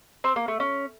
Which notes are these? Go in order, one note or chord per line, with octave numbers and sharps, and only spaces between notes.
C4
A#3
A3
C#4